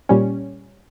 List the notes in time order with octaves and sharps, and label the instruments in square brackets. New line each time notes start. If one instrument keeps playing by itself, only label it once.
[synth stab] A#2 G3 C#4